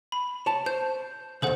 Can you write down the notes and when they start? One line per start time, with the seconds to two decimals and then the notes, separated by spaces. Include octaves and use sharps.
0.12 B5
0.46 C#5 A5
0.66 C5 G6
1.42 D#2 C#3 A4 C5 F#5